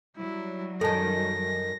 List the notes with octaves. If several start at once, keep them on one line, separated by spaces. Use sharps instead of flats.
F#3 G3 E4
F#2 D#3 A4 A5 A#6